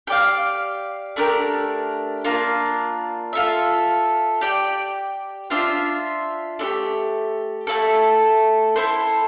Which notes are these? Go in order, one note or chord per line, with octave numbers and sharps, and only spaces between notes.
G4 D5 F5
A3 D4 G4 A#4
A#3 D4 F4
F4 A4 E5
G4 D5 G5
D4 F4 C5 E5
A3 D4 G4
A3 C4 E4 A4
E4 A4 C5